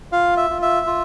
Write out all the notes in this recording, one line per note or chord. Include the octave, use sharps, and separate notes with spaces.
F4 F5
E5
F4
E5
F4